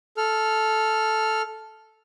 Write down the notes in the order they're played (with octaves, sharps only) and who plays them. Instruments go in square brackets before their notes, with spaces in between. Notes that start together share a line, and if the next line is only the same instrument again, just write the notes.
[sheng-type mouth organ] A4 F6